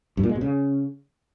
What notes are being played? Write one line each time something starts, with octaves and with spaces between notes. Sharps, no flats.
G2
A#2
G#3
B2
C#3